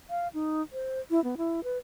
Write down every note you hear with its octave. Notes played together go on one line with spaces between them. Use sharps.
F5
D#4
C5
E4
B3
E4
B4